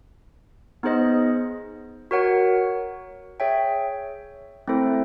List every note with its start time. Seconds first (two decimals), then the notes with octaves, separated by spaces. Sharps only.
0.83 B3 D#4 G#4 C5 D#5
2.11 F#4 A#4 C#5 F#5
3.40 G#4 C#5 E5 G5
4.68 A3 C4 E4 A4 C5